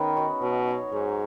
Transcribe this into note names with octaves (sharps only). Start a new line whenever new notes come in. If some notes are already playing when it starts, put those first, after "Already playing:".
Already playing: D#3 B3 C#4 G#4 B4
D#4 F#4 C#5
B2 F#3
D#4 F#4 C#5
G#2 F#3